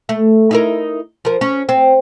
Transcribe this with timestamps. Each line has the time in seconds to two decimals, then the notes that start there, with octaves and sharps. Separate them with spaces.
0.09 A3
0.51 D#4 E4 A#4
1.25 F3 A#4
1.41 C#4
1.69 C4